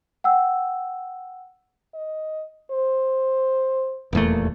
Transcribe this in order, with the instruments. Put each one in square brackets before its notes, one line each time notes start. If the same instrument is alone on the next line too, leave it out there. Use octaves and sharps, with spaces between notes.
[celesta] F#5 G5 E6
[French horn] D#5
C5
[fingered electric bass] D#1 E2 A3 [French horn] A#3